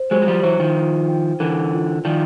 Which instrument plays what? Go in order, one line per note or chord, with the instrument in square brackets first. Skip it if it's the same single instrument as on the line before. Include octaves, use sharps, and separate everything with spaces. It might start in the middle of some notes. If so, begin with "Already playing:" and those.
Already playing: [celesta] C5
[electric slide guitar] F#3 G#3 [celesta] C5
[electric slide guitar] F#3
F3 G3
[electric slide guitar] E3 F#3 [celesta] C5
[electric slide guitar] D#3 F3
[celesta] F4
G5
[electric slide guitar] D3 E3 [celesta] A#4
[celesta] F4
[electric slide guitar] D#3 F3 [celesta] D5